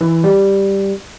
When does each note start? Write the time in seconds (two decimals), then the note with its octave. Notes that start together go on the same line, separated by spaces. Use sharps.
0.01 E3
0.24 G3